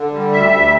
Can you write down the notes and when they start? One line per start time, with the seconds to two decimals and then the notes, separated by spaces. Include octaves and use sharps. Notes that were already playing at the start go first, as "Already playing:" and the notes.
Already playing: D3
0.13 G3
0.32 D2 E5
0.52 D2